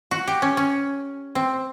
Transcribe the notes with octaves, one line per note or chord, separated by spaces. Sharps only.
F#4
G4
C#4
C#4
C4